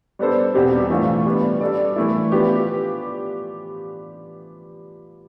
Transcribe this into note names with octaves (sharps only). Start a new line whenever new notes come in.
G3 B3 D4 A4 C5
E2 B2 G3 C4 G4
E3 A3 D4 F4
G3 B3 D4
G3 D4 A4 D5
E3 A3 E4
F3 B3 D4 G4